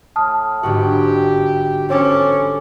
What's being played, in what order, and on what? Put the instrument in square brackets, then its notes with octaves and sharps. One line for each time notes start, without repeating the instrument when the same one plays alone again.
[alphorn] A2 [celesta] A5 D#6 F6
[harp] G1 G#2 F#4 [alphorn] G4
[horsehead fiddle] C#4 [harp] A4 D6 A6 [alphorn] C5 [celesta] C#5